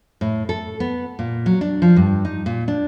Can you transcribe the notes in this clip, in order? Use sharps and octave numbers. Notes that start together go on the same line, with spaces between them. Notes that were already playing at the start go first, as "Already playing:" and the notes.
A2
A4
B3
A#2
F#3
D4
F3
G2
D#4
A#2
D4